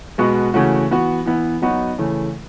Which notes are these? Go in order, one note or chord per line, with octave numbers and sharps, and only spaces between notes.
B2 G#3 B3 F#4
C#3 E3 A3 C#4 F#4
E3 B3 F#4
E3 B3 E4
F#3 B3 D#4 F#4
C#3 E3 A3